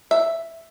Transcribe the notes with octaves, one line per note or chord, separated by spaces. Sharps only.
E5